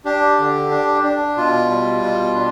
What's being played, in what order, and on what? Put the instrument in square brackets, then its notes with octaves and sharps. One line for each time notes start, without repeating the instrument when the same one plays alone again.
[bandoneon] D4 G4
D3
D4
D4
B2 F4
G3
B2
D4